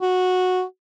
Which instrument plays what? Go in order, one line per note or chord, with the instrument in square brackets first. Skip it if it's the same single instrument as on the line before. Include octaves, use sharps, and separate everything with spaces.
[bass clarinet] F#4